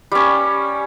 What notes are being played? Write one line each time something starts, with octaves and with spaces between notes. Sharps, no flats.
G3 C#4